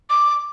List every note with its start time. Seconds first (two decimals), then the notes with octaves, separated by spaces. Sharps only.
0.10 D6